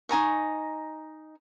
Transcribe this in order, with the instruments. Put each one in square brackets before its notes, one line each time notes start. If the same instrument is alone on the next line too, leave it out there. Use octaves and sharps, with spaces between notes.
[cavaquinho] D#4 G#5 A#5 C#6